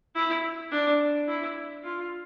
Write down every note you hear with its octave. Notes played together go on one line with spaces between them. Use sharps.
E4
D4
E4
F4